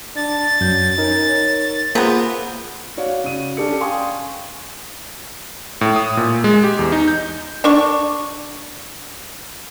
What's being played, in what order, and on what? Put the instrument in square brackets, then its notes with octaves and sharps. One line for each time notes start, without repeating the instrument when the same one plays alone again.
[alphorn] D4 [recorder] A6
[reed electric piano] F#2 G6 [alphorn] F#3
[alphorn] C#4 [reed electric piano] D#4 A#4
[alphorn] C#5
[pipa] C3 B3 [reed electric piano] A#3 G#4 [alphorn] F4
[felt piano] F#4 C#5 D5 F5
C#3 F#4 D#7
C#4 D4 G4 A4 C#7
F5 G5 G#5 C6 C#6 D#6
[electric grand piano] A2
D#6
A#2
G#3
G4
E2
D#4
G6
[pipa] D4 C#6